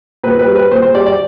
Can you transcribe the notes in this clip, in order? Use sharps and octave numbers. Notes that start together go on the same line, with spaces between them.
A#2 B4
B4
G3
B4
A#2 C5
C5
G3 D5
D5